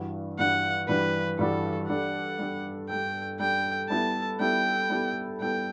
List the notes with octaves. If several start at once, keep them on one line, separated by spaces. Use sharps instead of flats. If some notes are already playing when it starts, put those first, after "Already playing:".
Already playing: G2 E3 G3 D4 F#4
G2 E3 G3 D4 F#4 F#5
G2 E3 G3 D4 F#4 B4
G2 E3 G3 D4 F#4 A4
G3 D4 A4 F#5
G3 D4 A4
G3 D4 A4 G5
G3 D4 A4 G5
G3 B3 E4 A4 A5
G3 B3 E4 A4 G5
G3 B3 E4 A4
G3 B3 E4 A4 G5